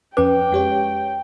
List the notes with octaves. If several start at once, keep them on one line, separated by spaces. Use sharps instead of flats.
F2 C#4 B4 G5 D6
G#3 G4 C#5